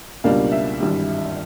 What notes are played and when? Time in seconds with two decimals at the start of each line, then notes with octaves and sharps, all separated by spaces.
0.24 C#2 B2 G3 A#3 D4 F5
0.52 E5
0.80 G#1 G2 E3 G3